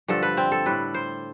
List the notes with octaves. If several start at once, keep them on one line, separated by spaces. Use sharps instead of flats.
G2 D3 F3 A4
B4
C4
A4
A2 G3 B4
C5